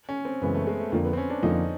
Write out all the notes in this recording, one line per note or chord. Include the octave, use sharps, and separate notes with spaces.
C#4
C4
F#2 C#3 E3 G#3 B3
A3
G#3
A3
F2 D3 F3 A3 A#3
B3
C4
C#4
D4
F2 D3 F3 A#3 D#4